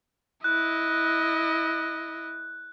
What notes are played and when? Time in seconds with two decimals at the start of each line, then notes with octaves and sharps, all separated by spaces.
0.44 E4 D#5 F#6